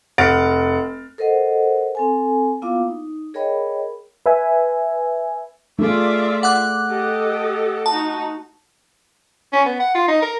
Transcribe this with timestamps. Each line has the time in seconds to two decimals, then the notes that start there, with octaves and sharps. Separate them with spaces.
0.18 F1 F#5 F6 A6 D7
1.18 A4 A#4 C5 D#5 F#5
1.95 C4 A4 G#5
2.62 A#3 B3 E4 F4 F5 D6
2.88 D#4
3.34 G#4 A#4 C#5 D#5 G5 B5
4.26 B4 E5 G#5
5.79 A3 F4 G#4 D5 E5
6.43 F#5 D6 F#6
6.89 G4 A4 D#5
7.86 D#4 F#4 A5
9.53 C#4
9.66 B3
9.80 F#5
9.95 F4
10.08 D#4
10.22 A#4